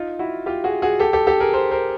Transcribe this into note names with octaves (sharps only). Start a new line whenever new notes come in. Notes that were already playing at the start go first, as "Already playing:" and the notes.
Already playing: D#4 F4
E4 F#4
F4 G4
F#4 G#4
F#4 G#4
G4 A4
G4 A4
G4 A4
G#4 A#4
A#4 C5
A#4 C5